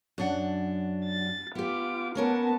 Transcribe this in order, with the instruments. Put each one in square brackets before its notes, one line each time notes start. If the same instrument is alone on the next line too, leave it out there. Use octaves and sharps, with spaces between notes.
[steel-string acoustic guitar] F#2 D4 F#5
[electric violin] A6
[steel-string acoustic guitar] B3 G4 [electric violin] F4 D6
[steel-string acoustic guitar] A#3 C#4 A#4 [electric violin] B3 A5